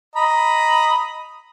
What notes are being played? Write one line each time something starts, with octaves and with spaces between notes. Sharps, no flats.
D#5 A#5 B5